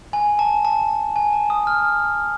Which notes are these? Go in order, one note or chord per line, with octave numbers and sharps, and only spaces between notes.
G#5
A5
A5
G#5
A5
D#6
F6